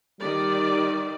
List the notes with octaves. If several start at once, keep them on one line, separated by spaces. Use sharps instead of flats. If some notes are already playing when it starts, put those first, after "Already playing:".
D#3 G3 D5